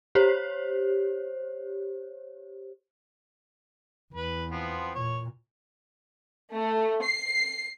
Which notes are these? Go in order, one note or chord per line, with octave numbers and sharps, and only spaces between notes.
G4 C5 C#5
E2 B4
F3 B3 C4
A#2 C#5
A3
C7